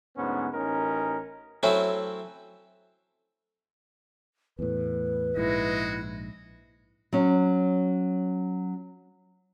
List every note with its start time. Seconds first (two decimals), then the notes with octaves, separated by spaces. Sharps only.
0.17 D2 G#2 B3 C#4
0.54 A1 C#4 D#4 A#4
1.63 F#3 A3 C4 C#4 E4
4.59 E2 A2 B4
5.36 A#1 G#2 G#3 E4 F#4 D#5
7.13 F#3 C#4